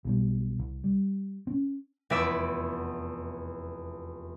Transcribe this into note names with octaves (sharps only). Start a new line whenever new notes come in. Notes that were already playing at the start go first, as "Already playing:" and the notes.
B1 B2 G3
C2
G3
C4 C#4
F1 E2 D5 E5 B5 D6